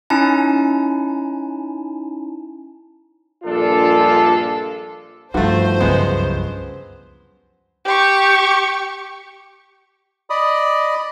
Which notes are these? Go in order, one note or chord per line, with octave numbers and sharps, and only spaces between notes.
C#4 D#4 E4 G#5 A5
A#1 G2 G#3 D4 F4 A4
G2 F3 A3 D#4 F#4 C5
C#2 F#2 G#3 B3
G4 C#6
D5 D#5 B5 D#6